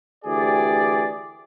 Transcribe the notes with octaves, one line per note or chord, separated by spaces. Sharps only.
D2 E3 G4 G#4 D5